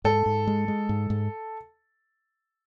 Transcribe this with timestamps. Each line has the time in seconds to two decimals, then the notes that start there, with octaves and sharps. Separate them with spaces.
0.04 G#2 A4
0.26 G#2
0.47 G#3
0.68 G#3
0.89 G#2
1.10 G#2